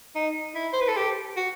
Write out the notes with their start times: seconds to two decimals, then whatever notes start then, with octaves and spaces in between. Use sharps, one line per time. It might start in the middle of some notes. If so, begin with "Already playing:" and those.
0.15 D#4
0.55 E4
0.73 C5
0.81 B4
0.88 A4
0.96 G4
1.37 F#4